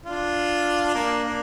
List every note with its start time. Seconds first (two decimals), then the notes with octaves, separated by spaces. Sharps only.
0.06 D4 F4
0.94 A#3 D4
1.24 A#3 D4